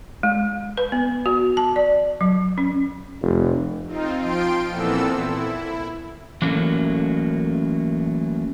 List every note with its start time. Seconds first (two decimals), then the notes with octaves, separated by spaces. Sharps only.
0.23 G#3
0.77 B4
0.92 B3
1.26 F#4
1.57 A5
1.76 D5
2.21 F#3
2.58 C#4
3.23 F1
3.87 C4 D#4 F4
4.19 F3 F4 G5 C6 D7
4.68 A#2 E3 B3 C4 A4 E6
5.18 E4
6.42 E3 F#3 A3 A#3 C#4